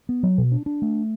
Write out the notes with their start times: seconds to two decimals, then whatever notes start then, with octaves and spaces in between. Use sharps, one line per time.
0.09 B3
0.23 F#3
0.38 B2
0.52 D4
0.66 D4
0.82 A3